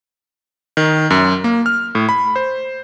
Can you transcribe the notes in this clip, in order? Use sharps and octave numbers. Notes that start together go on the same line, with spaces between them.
D#3
F#2
A#3
F6
A2
B5
C5